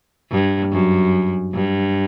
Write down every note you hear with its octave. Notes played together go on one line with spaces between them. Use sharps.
G2
F#2
G2